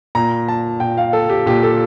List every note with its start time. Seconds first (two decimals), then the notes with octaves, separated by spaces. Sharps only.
0.15 A#2 A#5
0.48 A5
0.80 A#2 G5
0.97 F5
1.13 A4
1.30 G4
1.46 A#2 G4
1.63 A4